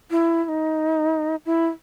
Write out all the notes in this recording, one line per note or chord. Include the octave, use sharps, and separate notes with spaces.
E4
E4
D#4
E4